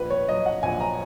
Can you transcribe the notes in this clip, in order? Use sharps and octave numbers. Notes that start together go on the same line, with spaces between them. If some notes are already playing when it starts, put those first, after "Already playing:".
Already playing: A#1 B4
C#5
F#3 D#5
F#5
A#1 G#5
A#5